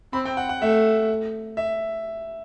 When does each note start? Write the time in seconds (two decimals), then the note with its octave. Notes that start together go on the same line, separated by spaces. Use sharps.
0.13 C4 B5
0.25 G5
0.37 F#5
0.49 F#5
0.61 A3 E5
1.57 E5